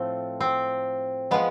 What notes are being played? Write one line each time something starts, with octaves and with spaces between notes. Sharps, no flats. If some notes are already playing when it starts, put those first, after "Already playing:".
Already playing: A2 F3 A3 C4
C4
F3 G#3 B3